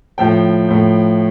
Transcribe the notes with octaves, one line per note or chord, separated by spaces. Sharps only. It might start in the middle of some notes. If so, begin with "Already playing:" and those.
A2 F3 G5
A2 F3